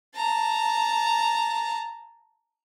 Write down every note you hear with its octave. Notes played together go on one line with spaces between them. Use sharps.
A5 A#5